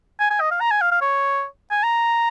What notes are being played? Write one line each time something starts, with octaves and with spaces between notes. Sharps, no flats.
G#5
G#5
D#5
F5
A#5
G#5
F5
F5
C#5
G#5
A#5